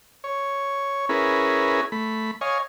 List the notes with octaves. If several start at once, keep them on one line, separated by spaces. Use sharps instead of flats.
C#5
C#4 E4 G#4 A#4 B4
A3 B5
C#5 D#5 F5 G#5